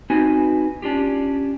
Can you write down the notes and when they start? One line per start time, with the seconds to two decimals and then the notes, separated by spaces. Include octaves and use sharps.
0.10 C4 D#4 F#4 B4 G#5
0.82 C#4 D4 F4 G4